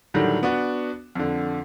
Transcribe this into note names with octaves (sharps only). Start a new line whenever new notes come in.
A2 D3 D#3 F#3 G3
B3 D4 F#4
F2 D3